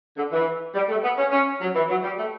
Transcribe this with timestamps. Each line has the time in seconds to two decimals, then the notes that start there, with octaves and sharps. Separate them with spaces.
0.17 D3
0.32 E3
0.75 G3
0.89 A3
1.03 B3
1.17 C#4
1.31 C#4
1.61 F#3
1.75 E3
1.89 F#3
2.03 G3
2.18 A3